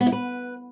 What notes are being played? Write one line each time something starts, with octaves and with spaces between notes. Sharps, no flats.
B3
E4
B4